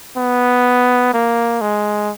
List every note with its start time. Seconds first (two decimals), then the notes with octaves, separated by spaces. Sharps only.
0.17 B3
1.13 A#3
1.61 G#3